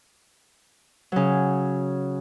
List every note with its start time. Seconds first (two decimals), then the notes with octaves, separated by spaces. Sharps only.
1.12 C#3 F#3